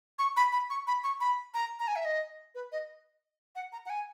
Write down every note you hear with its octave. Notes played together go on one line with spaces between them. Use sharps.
C#6
B5
B5
C#6
B5
C#6
B5
A#5
A#5
G#5
E5
D#5
B4
D#5
F#5
A#5
F#5
G#5